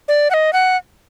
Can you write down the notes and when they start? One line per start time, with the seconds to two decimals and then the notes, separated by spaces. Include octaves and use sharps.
0.08 D5
0.30 F#5
0.34 D#5
0.53 F#5